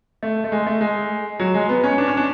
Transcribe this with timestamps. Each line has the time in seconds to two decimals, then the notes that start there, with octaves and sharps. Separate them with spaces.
0.23 A3
0.44 A3
0.52 G#3
0.67 A3
0.81 G#3
1.40 F#3
1.54 G#3
1.69 B3
1.84 C#4
1.98 D4
2.08 C#4
2.17 D4